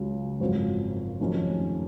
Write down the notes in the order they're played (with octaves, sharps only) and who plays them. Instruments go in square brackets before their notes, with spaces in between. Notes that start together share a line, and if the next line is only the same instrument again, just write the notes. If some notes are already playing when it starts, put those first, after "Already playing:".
Already playing: [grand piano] C#2 C#3 F#3
G#1 F#2 F3 C4 F#4
F1 F2 D#3 F#3 C#4